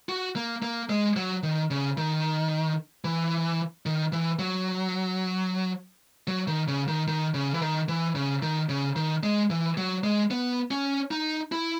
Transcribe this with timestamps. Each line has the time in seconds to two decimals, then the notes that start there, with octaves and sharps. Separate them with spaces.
0.09 F#4
0.36 A#3
0.62 A#3
0.89 G#3
1.16 F#3
1.43 D#3
1.71 C#3
1.97 D#3
3.04 E3
3.86 D#3
4.12 E3
4.39 F#3
6.27 F#3
6.48 D#3
6.68 C#3
6.88 D#3
7.08 D#3
7.34 C#3
7.54 E3
7.61 D#3
7.88 E3
8.15 C#3
8.42 D#3
8.69 C#3
8.96 D#3
9.23 G#3
9.50 E3
9.77 F#3
10.04 G#3
10.31 B3
10.71 C#4
11.11 D#4
11.52 E4